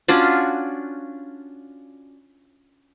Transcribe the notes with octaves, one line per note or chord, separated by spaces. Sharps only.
C#4 D4 F4 F#4